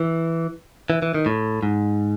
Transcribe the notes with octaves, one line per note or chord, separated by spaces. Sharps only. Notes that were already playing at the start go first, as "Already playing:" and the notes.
Already playing: E3
E3
E3
D#3
A2
G#2